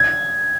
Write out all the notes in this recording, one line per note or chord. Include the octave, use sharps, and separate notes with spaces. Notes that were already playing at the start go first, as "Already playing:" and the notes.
Already playing: G#6